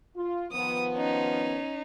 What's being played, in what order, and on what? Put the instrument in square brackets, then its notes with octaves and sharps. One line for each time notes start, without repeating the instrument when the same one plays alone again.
[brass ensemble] F4
[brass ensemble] D#3 F3 B3 [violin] D#6
[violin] C#4 D#4